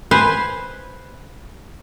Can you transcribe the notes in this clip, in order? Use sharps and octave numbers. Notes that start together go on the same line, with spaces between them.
B4 C5 G#5